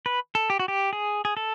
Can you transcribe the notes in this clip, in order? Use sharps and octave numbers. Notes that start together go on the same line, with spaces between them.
B4
A4
G4
F#4
G4
G#4
G#4
A4